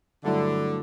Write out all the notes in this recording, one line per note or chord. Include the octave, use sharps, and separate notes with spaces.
G2 D3 F#3 A3 E4